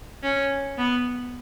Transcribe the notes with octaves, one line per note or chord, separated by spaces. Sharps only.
C#4
B3